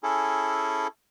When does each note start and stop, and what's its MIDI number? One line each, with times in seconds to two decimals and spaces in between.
0.03 0.87 61
0.03 0.87 64
0.03 0.87 68
0.03 0.87 69